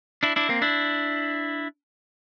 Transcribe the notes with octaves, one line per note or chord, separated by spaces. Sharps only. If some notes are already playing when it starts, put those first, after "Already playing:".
D4 E4
D4 E4
A#3 C4
D4 E4